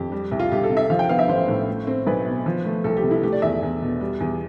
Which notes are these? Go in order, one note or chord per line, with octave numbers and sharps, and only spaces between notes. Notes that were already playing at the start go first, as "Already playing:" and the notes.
Already playing: F2 G4
G3
C2
F4
C2 G4
A4
C3
E5
F3 F5
G5
B3 F5
E5
A1 C5
A2
A3
C4
B1 B4
B2
F3
A3
C2 A4
G4
C3
E4
A3 G4
D5
E2 E5
E2
B2
G3
E2